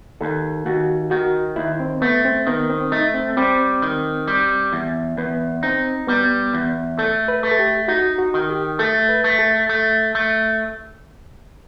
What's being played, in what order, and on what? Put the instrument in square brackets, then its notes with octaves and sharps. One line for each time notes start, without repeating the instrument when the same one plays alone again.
[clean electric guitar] D#2 [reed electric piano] A4
[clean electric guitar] D#2 [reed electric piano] F#4
[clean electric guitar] D#3 [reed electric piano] F#4
[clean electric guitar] D#2 [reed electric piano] E4
[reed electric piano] C4
[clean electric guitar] A3 [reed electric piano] B3
[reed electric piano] C4
[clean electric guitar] D#3 [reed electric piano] B3
[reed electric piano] C4
[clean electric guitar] A3 [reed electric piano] D#4
[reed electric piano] C4
[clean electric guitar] G3 [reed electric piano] C4
[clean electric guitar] D#3
G3
E2
[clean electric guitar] E2 [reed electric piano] B3
[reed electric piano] C4 [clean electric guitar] D#4
[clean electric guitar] G3 [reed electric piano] B3
[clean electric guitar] E2
[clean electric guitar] A3 [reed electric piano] A4
[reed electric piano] B4
[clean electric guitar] A3
[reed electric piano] A4
G4
[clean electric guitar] D#4 [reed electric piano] F#4
[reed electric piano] F#4
[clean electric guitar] D#3
[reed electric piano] G4
[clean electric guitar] A3 [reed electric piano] A4
[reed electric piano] B4
[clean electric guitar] A3
[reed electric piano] A4
[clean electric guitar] A3
A3